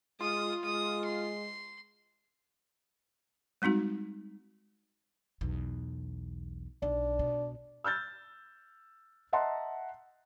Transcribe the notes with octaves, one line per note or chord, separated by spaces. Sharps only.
G#3 F4 D#6
G#3 D#6
C6
G3 G#3 C4 D#4 F#4
B1 E2
B1 D4
B2
E6 F6 G6 A6
D#5 E5 F#5 A5 A#5 C6